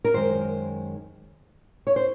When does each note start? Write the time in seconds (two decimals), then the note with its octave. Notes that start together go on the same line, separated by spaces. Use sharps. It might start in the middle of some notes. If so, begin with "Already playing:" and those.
0.04 A#4
0.14 F#2 D#3 G#3 C5
1.87 C#5
1.96 C5